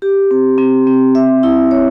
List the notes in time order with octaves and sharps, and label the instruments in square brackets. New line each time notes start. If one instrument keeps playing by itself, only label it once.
[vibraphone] G4
C4
C4
C4
E5
E4
C#5